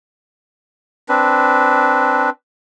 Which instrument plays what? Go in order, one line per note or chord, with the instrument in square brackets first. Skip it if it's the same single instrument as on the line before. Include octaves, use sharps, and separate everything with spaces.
[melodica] C4 D4 B4